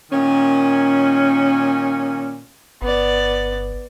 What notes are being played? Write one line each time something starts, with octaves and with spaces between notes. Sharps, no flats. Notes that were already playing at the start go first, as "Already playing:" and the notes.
A#2 D#3 C#4
G1 B3 D5